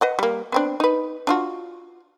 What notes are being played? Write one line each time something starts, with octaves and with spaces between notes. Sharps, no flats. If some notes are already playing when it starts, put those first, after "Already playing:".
B4 D#5 F#5
G3 A#3
B3 C4 D4
D#4 B4
D4 F4 F#4